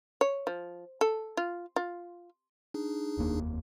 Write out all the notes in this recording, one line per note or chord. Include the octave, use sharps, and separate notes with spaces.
C#5
F3
A4
F4
F4
D4 D#4 G#4
F1 D#2 A#3